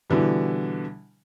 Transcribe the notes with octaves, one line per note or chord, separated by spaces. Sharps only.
B2 D3 E3 G3